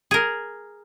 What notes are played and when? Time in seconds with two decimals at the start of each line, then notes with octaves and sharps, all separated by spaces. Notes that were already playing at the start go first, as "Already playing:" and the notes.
0.11 G#4 A#4